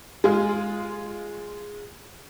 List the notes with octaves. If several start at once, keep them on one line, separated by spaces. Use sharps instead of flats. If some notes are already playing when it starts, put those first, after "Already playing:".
G#3 F4 G#4